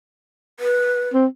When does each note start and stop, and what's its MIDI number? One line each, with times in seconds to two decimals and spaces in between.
0.60 1.09 71
1.14 1.26 60